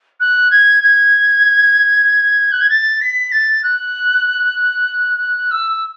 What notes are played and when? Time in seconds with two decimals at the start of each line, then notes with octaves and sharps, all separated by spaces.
0.20 F#6
0.51 G#6
0.82 G#6
2.52 F#6
2.61 G#6
2.69 A6
3.01 B6
3.32 A6
3.63 F#6
5.51 E6